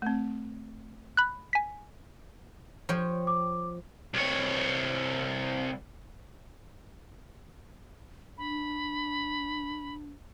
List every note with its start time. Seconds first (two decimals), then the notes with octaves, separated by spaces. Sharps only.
0.02 A3 C4
1.17 B5 F#6
1.53 G#5 B6
2.89 F3 C#5 G5
3.27 D6
4.14 C2 C#5
8.38 D4 B5